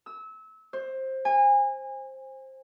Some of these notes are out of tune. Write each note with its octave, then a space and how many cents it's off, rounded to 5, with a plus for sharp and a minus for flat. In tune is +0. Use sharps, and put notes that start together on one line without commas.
E6 -25
C5 +15
G#5 -30